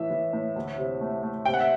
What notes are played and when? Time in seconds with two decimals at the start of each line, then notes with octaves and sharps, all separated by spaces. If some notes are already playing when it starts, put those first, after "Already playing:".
Already playing: A2 E3 E5
0.11 E3
0.33 A2
0.56 D2
0.78 C3
1.01 A3
1.23 A3
1.45 C3 G5
1.54 F#5
1.60 E5